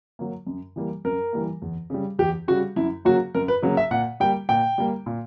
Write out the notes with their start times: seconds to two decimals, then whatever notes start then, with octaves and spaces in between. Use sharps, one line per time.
0.19 F#3 A#3
0.47 F#2
0.76 E3 G3 A#3
1.05 F#2 A#4
1.33 E3 G3 A#3
1.62 E2
1.90 C#3 G3
2.19 E2 G4
2.48 C#3 G3 F#4
2.76 F#2 E4
3.05 C#3 F#3 A#3 F#4
3.35 F#2 A#4
3.48 B4
3.62 C#3 F#3 A#3
3.77 E5
3.91 A#2 F#5
4.20 G3 A#3 G5
4.49 A#2 G5
4.78 G3 A#3
5.06 A#2